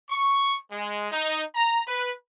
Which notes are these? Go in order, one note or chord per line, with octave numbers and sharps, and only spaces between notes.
C#6
G#3
D#4
A#5
B4